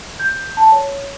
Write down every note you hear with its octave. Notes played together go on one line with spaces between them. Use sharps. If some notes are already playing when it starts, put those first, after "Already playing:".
G6
A5
C#5